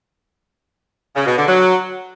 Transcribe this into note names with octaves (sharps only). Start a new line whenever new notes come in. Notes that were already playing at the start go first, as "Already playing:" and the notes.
C#3
B2
D3
F#3